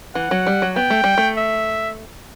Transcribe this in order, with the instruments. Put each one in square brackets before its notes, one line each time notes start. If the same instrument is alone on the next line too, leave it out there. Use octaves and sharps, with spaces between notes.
[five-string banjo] E3 [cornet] F#5
[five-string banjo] F#3
G3
F#3
[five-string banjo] B3 [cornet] G5
[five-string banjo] A3
G3
A3
[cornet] E5